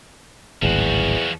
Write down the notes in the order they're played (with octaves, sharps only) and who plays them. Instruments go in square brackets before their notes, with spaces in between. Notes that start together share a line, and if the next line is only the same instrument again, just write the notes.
[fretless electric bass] D1 G#1 [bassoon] E2 [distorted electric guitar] F3 F#4